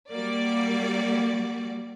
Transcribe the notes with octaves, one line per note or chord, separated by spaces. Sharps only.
G3 A#3 F#4 D5